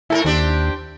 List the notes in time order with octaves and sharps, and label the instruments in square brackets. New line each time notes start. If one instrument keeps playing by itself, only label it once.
[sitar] A2 A4 A#4 [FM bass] E4
[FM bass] D#2 [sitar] C4 D4 G4